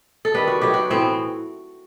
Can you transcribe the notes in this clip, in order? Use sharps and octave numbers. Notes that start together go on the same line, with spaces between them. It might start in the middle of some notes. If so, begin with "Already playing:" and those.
A4
D#3 G3 B3 B4
F#4
B2 F#3 A3 G4
F#4
A2 E3 B3 C4